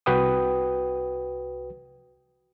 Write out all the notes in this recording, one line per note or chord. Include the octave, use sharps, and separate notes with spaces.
C2 F#4 B4 G5 D#6